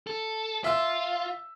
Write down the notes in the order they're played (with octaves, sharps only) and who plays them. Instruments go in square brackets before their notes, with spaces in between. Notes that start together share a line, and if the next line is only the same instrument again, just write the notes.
[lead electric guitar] A4
[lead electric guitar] F4 [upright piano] E5 E6